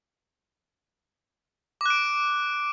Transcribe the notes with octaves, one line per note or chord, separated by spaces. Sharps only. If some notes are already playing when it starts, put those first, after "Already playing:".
D6 F#6 D7